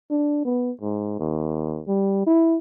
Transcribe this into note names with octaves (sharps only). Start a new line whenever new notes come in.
D4
B3
G#2
D#2
G3
E4